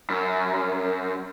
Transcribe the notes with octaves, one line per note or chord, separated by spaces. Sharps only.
F#2